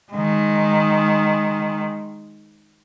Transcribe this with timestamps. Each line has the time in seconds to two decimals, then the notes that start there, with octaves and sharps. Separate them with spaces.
0.12 D#3 G#3